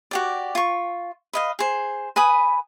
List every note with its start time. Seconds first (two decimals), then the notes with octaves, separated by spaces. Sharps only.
0.11 F#4 G4 D5
0.55 F4 C#6
1.33 B4 D#5 F5
1.59 G#4 C5
2.16 B4 G#5 B5 D#6